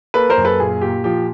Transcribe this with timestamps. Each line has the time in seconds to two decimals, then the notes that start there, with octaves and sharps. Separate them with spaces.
0.14 A#3 A4 B4
0.30 A#4 C5
0.38 F#2
0.45 A4 B4
0.60 A#2 G#4
0.81 A#2 G4
1.04 F3 G4